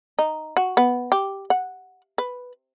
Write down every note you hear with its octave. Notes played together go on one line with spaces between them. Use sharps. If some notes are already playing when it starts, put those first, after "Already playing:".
D#4
F#4
B3
G4
F#5
B4